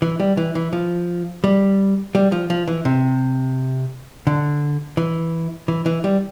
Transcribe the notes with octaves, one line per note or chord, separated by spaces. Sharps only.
E3
G3
E3
E3
F3
G3
G3
F3
F3
E3
C3
D3
E3
E3
E3
G3